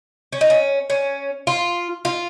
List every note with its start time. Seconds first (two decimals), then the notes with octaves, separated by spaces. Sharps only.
0.33 C#4
0.41 D#4
0.50 C#4
0.90 C#4
1.47 F4
2.05 F4